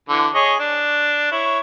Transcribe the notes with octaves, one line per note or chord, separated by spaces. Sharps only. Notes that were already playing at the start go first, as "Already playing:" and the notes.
D3 E3
G#4 C#5 D#5
D4
E4 C#5